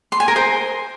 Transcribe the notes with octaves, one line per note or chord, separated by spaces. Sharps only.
C6
G#5
A#4
C5